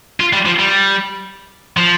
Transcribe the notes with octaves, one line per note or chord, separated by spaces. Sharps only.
F4
G3
F3
G3
F3